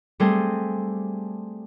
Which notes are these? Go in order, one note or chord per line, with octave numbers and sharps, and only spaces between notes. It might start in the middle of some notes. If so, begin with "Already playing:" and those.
G3 A3 C4 G#4 C5